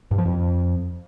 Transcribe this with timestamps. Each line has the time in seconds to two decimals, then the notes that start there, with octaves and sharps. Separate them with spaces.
0.11 G2
0.18 F3
0.25 F2